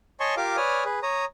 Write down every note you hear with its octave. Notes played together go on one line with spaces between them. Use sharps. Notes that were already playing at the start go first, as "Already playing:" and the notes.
C#5 D#5 G#5 A5 C6 C#6
F4 G4 A#4 F5 D6
B4 C#5 D5 G#5 D#6 F6
G#4 B4
C#5 A#5 D#6